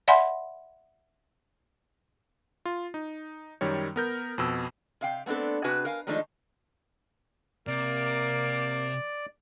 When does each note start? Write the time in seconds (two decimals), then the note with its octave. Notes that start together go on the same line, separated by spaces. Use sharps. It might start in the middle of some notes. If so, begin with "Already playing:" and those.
0.08 D5 E5 F#5 G#5 B5 C6
2.65 F4
2.94 D#4
3.61 F#2 D#3 G3 C#5
3.96 B3 A#4 G6
4.38 F2 B2 E6
5.01 C3 F5 G5
5.26 A3 B3 C4 D4 A4
5.64 C3 D4 F#4 G#4 B4
5.85 A#4 F5 G#5
6.07 D#3 F3 G#3 A3 D4 D#4
7.67 C3 A#3 D5